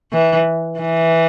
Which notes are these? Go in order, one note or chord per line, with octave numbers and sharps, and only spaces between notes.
E3
E3